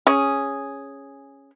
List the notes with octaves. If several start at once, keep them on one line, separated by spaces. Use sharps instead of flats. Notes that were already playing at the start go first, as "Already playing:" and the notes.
C#4 G#4